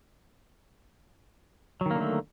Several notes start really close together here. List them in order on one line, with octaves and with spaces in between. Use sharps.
F#3 D#3 A#3 D3 A3